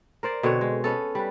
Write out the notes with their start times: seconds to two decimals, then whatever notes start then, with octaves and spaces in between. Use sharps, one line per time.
0.23 A#4 C5 D5
0.43 B2 D3 C4 C#5
0.61 G#3
0.84 B3 C#4 A4
1.15 G3 B4